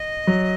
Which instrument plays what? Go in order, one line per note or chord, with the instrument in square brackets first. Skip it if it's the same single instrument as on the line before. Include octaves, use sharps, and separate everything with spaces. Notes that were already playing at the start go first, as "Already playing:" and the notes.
Already playing: [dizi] D#5
[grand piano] F#3